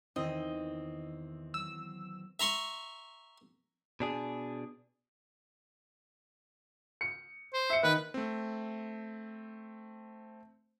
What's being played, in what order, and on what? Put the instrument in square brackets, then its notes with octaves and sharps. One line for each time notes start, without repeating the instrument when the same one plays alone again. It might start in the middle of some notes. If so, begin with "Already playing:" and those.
[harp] E2 D#3 [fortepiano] C4 [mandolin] D#5
[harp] F#3 [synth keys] E6
[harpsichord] E5 A#5 C6 C#6
[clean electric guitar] B2 D4 G#4
[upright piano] C#7
[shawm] C5
[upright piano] E5 C#7
[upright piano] D#3 [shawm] B4
[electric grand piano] A3 C4